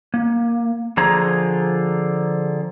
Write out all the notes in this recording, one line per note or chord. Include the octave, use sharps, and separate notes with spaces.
A#3
D3 F3 F4 G#4 A#5